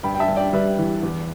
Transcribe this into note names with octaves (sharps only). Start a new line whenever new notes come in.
G2 G5 B5
G5
E5 A5
G2
D5 G5
G3 B4 E5
E3
E2